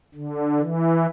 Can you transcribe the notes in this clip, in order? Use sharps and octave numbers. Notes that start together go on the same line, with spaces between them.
D3
E3